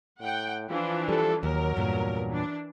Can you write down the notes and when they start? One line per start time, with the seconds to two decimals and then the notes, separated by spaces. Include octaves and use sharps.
0.20 A2 F#5 G5
0.70 E3 F3 D4 F4
1.09 G3 A4
1.43 D#2 F#3 A#4
1.76 E2 G2 A#2
2.30 E3 D4